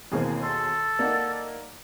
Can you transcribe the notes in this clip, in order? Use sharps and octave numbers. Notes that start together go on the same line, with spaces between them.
D#2 B2 E3 A#3 C4 G#4
A4 C6
A#3 D#4 D5 F#5